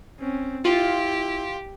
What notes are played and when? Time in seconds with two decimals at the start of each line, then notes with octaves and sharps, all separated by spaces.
0.20 C4 C#4
0.65 E4 F4 G4